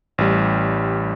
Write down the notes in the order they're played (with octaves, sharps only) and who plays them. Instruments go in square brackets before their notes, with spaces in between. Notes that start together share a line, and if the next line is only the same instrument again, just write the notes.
[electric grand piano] A1 G3